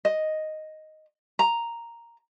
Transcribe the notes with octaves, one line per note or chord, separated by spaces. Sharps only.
D#5
A#5